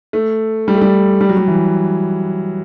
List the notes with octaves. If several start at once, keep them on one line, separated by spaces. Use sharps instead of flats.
A3
G3
A3
G3
G3
F#3
G3
E3